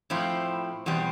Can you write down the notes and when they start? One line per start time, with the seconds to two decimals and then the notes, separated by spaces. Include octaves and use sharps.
0.10 A2 F3 C4 E4
0.86 E2 B2 G3 C4